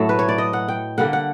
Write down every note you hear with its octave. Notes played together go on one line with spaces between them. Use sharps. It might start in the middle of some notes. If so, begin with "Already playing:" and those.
Already playing: A2 F#3 A3
B4
C#5
D5
D#5
F#5
G5
D3 G3 A#3 F#5
F#5